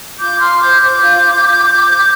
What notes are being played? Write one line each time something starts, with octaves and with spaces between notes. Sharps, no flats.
F4 D6 G6
F4 C6 F6
C5 D6 G6
C5 D6 G6
F4
F4
F4
F4
C5